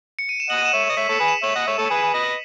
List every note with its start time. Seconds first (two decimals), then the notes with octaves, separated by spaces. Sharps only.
0.19 C#7
0.29 D#7
0.40 E7
0.50 D#5 F#5 F#7
0.58 D#7
0.65 E7
0.73 C#5 E5
0.81 C#7
0.89 D#5
0.97 C#5 E5 B6
1.08 A4 C#5 C#7
1.20 G#4 B4
1.28 E7
1.43 C#5 E5 F#7
1.56 D#5 F#5
1.67 C#5 E5
1.78 A4 C#5
1.90 G#4 B4
2.13 B4 D#5